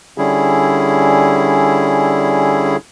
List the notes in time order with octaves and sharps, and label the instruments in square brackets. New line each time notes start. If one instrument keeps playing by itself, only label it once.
[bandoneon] D3 G3 C#4 E4 G#4